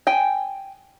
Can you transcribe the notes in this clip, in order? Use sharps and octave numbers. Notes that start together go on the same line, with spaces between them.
G5 G#5